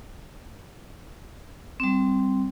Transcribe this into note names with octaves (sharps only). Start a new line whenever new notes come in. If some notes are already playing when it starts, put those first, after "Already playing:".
G3 C4